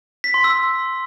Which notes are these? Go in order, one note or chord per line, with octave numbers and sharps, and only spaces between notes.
B6
C6
E6